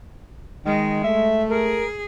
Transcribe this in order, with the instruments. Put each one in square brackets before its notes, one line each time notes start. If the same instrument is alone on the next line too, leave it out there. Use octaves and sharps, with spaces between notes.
[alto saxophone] D#3 [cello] G#3
[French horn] A3 [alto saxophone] E5
[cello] G#4 [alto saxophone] A#4